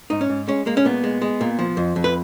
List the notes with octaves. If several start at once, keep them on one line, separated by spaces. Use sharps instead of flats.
G#2 D#4
C#4
G#2
G#3 C#4
G#3 A#3
C#4
A#2 B3
G#3
G#3
A#2
F3
F2
F2
B4